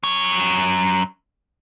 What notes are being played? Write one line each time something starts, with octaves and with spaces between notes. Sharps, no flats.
F#2 C#5